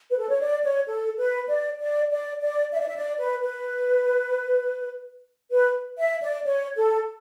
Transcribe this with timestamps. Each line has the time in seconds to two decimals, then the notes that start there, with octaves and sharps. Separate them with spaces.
0.10 B4
0.18 A4
0.29 C#5
0.40 D5
0.63 C#5
0.87 A4
1.18 B4
1.48 D5
1.79 D5
2.11 D5
2.42 D5
2.72 E5
2.80 D5
2.87 E5
2.96 D5
3.19 B4
3.42 B4
5.51 B4
5.98 E5
6.21 D5
6.45 C#5
6.75 A4